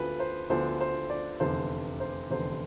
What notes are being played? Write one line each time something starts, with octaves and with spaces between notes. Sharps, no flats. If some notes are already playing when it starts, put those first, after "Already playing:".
Already playing: D2 D3 F3 B3 B4
C5
D2 D3 F3 B3 C5
C5
D5
F1 E2 D3 C5
C5
F1 E2 D3 C5